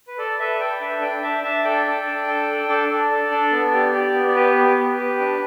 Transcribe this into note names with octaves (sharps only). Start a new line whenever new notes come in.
B4
A4 D5
A4 B4 E5
A4 D5 G5
D4 B4 E5
D4 D5 G5
D4 E5 A5
D4 E5 A5
A4 D5 G5
A4
D4
A4
A4
D4 A4 D5
A4
A4
D4
B3
G4
G4
B3
D5
G4 B4
B3
G4
G4
D4